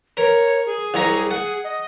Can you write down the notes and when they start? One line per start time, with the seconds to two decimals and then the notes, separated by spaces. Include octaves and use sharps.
0.17 A#4 C#5
0.66 G#4
0.94 C2 C#5 A#5
1.31 G#4 F#5
1.64 D#5